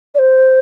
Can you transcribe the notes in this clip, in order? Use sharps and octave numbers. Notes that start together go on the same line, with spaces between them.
D5
C5